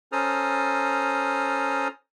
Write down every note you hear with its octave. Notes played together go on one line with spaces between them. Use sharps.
C#4 A4 C5 A#5 D#6 F6